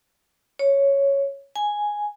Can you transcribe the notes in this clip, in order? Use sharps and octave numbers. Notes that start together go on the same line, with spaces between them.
C#5
G#5